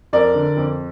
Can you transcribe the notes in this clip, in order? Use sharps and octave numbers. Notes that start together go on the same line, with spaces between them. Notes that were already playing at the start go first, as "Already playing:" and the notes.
F2 A#4 D5
D3
F2